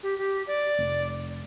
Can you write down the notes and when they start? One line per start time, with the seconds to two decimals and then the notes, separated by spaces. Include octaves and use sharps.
0.03 G4
0.18 G4
0.47 D5
0.79 F1